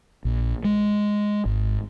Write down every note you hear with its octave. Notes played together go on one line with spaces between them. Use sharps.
A#1
G#3
G#1